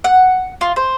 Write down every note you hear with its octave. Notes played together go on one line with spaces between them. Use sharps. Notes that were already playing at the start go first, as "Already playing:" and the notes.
F#5
F4
C5